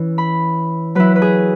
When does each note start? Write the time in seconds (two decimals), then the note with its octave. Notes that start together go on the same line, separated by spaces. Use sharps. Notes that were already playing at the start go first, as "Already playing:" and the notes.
Already playing: E3 C#4 E4
0.18 B5
0.95 F#3 E4 B4
1.16 B4
1.22 G#4